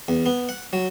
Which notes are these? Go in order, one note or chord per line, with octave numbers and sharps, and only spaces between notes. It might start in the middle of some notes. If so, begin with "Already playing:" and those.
E2
B3
F#5
F#3